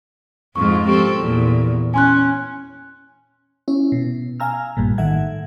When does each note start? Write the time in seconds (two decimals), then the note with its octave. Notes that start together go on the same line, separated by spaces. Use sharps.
0.56 F2 G#2 F4 C#6
0.88 F3 C4 G4 A4 C#6 D7
1.19 E2 A#2
1.94 C#4 G#5 C6 F#6
3.68 C#4 E4
3.92 B2
4.40 F5 G#5 A#5 E6 F6
4.77 A#1 G2 A#2
4.98 A2 D#3 A4 E5 F#5 G#6